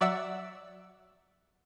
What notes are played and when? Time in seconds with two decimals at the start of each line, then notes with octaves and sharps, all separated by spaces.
0.01 F#3 D5 E5 F#5 E6